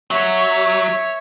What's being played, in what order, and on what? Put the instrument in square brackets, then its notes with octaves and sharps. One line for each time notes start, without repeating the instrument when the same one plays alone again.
[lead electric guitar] F#3 [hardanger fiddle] C#5 E5